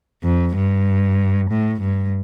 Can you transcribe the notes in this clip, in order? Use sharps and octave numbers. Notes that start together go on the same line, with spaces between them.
F2
G2
A2
G2